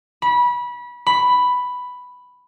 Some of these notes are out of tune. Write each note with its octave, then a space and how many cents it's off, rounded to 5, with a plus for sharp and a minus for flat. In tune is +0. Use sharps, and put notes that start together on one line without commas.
B5 -25
B5 +5